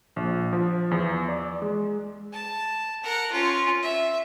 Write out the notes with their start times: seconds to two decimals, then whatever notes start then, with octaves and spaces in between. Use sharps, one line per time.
0.16 A#1
0.53 F3
0.91 E2
1.29 D5
1.62 G#3
2.33 A5
3.03 A#4 F#5
3.32 C#4 F4
3.83 E5